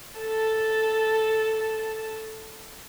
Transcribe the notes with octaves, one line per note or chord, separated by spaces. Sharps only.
A4 A5